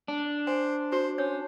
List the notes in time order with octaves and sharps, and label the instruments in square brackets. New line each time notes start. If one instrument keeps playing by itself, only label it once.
[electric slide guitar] D4
[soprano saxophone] C5 [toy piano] G#5
[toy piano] F#4 [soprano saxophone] C5
[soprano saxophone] C#4 [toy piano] C#5